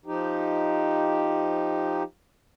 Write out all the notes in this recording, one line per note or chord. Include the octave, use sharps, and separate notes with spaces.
F3 D#4 G4